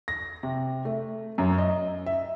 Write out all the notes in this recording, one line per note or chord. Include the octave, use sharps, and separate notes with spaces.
A#6
C3
A3
F#2
D#5
E5